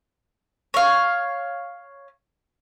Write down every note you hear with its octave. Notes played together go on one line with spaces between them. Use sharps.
C#5 F5